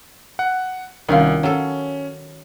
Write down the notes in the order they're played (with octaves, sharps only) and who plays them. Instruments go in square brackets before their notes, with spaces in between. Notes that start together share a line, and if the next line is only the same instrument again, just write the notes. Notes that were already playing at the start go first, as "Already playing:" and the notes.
[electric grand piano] F#5
[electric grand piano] C2 [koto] D#3 C#4 F4
[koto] F#3 A4 [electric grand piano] C#4